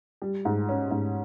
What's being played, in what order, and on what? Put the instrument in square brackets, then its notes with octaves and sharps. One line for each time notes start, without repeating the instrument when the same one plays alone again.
[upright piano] G3
G#2
C#4
G#2